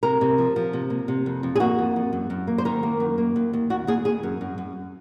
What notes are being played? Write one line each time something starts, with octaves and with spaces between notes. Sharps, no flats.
C3 A#4
C3
F3
F3
C3
A#3
C3
F2
F2
G#4
A#3 F#4
F2
F2
F#2
F#2
A#3
C5
D#3 A#4
A#3
F#2
A#3
D#2
D#2
D#2 F#4
D#2 G#4
D#2 G#4
F#2
F#2
F#2